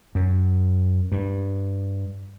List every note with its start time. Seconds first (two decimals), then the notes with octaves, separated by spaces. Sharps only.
0.15 F#2
1.12 G2